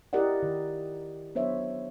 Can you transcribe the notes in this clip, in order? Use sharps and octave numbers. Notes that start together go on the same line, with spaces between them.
E4 G4 A#4 D5 D#5 F#5
D#3
F#3 B3 D4 C5 C#5 E5